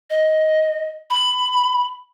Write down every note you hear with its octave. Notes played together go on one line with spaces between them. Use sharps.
D#5
B5